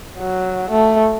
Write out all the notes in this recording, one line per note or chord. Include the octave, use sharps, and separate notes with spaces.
F#3
A3